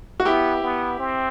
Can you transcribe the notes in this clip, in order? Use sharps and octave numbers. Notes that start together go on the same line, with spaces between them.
F#4
B3 E4 G4
B3
C4